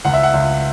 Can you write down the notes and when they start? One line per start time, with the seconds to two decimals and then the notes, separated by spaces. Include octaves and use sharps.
0.05 C#2 F#5
0.13 E5
0.23 F#5
0.34 C#2